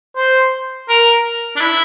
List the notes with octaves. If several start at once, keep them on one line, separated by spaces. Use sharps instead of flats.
C5
A#4
D4
E4